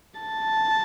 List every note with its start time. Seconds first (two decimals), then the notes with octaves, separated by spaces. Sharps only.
0.20 A5